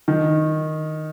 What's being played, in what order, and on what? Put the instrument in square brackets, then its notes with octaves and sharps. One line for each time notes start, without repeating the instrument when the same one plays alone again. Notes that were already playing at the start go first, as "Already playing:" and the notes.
[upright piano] D#3